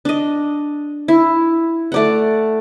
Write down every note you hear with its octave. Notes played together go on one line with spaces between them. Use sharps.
D4 D#5
E4
A3 D5 F#5